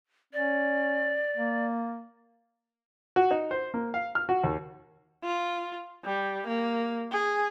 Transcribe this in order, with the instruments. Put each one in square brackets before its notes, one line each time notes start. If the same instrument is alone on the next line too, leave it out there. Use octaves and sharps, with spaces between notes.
[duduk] C#4 [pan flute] D5
[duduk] A#3
[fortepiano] F#4
D#4
C5
A#3
F5
F6
F#4
D#2
[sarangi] F4
G3
A#3
G#4